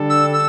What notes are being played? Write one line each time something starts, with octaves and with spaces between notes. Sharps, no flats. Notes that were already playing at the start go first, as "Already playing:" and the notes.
Already playing: D3 G3 D4 A4
E6
E6